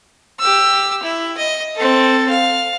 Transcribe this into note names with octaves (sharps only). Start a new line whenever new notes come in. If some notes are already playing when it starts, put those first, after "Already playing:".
G4 E6
E4
D#5
C4 A4
F5